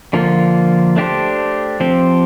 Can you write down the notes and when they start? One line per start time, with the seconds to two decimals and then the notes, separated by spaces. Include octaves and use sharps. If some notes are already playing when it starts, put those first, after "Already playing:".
0.13 D3 F3 A#3 F4
0.96 A3 D4 G4 C5
1.80 F3 C4 G4 C5